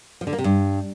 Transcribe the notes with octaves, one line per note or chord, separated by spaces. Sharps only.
F3
D3
A#3
C3
G2